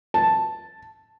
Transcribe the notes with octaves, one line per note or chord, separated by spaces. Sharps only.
A5